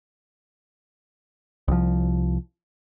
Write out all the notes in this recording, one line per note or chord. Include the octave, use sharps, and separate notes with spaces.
C2 F3